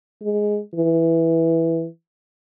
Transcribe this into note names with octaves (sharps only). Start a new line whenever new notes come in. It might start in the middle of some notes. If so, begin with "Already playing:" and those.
G#3
E3